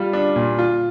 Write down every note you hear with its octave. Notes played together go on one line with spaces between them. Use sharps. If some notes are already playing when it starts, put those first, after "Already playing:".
Already playing: G3 F4
D4
A#2
F4